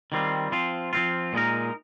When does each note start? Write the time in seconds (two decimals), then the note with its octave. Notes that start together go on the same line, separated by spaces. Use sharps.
0.12 D#3 G3 C4 F4
0.52 F3 C4 F4
0.93 F3 C4 F4
1.33 A#2 G#3 D#4 A#4